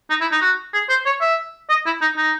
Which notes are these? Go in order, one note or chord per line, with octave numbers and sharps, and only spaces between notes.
D#4
E4
D#4
F#4
G#4
C5
C#5
E5
D#5
E4
D#4
D#4